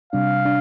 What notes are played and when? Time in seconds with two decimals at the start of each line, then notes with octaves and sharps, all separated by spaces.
0.13 C3 G3 D4 F5
0.45 D4